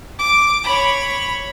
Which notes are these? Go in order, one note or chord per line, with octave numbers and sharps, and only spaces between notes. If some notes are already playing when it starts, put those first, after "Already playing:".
D6
C#5 B5